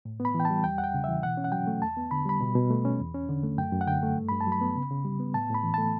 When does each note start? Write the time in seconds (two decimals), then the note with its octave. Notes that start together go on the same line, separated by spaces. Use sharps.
0.05 A2
0.20 B3
0.25 B5
0.34 E3
0.40 G5
0.45 A5
0.50 G3
0.64 E2 G5
0.78 E2 F#5
0.84 G5
0.94 C#3
1.04 E3 E5
1.23 B2 F#5
1.37 C#4
1.44 F#5
1.52 F#3 G5
1.67 A3
1.82 E2 A5
1.97 B3
2.11 D3 B5
2.26 G3 B5
2.41 B2
2.55 B2
2.70 A3
2.85 C#4
3.00 E2
3.15 C#4
3.29 D3
3.43 A3
3.58 F#2 G5
3.72 F#2
3.81 F#5
3.87 D3 G5
4.03 A3
4.17 G2
4.29 G2 B5
4.41 A5
4.47 F#3
4.52 B5
4.61 B3
4.76 C#3
4.91 C#3
5.05 G3
5.20 B3
5.34 A2 A5
5.50 A2 B5
5.63 E3
5.74 A3 A5